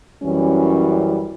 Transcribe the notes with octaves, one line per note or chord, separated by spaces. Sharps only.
F#2 E3 G3 C#4